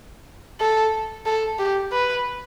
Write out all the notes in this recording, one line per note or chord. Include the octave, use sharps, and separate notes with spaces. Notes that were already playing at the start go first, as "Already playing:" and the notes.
A4
A4
G4
B4